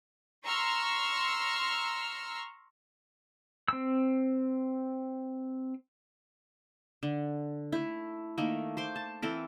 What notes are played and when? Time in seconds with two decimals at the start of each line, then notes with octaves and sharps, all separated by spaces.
0.45 A#5 C6 C#6 E6 F6
3.68 C4 E6
7.03 D3
7.72 A3 E4
8.38 D#3 A3 A#3
8.77 C5 C6 D6
8.96 A5
9.22 E3 C4 A4 A#4